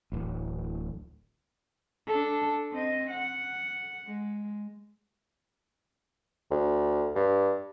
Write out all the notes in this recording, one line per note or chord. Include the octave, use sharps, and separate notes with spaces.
D1 A1
D4 A4
C4 D#5
F#5
G#3
D2
G2